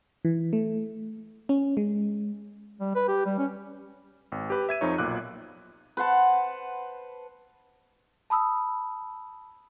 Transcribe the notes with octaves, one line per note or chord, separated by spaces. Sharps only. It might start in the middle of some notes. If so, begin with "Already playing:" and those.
E3
A3
C#4
G#3
G3
B4
G4
G3
C#4
G#1
G4 B4
E5 G#6 D#7
F2 F3 D#4 C#5
B1 A#2 D6 F#6
B4 C5 F#5 A5
A5 B5 D#6 E6